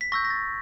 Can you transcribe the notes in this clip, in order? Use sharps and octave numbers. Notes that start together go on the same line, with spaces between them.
B6
C#6 E6 G6 A#6
A#6
A6